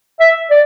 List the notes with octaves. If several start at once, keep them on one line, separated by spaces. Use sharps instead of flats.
E5
D5